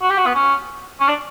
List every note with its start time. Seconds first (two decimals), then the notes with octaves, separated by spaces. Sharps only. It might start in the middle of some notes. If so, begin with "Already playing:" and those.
0.02 F#4
0.10 G4
0.18 F#4
0.26 B3
0.35 C#4
1.00 C#4
1.08 D4